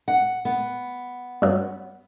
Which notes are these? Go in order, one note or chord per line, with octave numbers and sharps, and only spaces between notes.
F#5
B3
G2 F#3